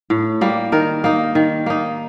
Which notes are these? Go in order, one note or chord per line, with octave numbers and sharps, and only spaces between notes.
A2
G3 A#3
D#3 A#4
A#3 D#4
D#3
A#3 D#4